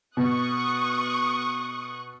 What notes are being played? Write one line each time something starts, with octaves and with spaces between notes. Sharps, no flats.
B2 C#6 D#6 F#6